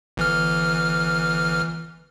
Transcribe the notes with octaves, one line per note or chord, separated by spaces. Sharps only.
G1 E3 F6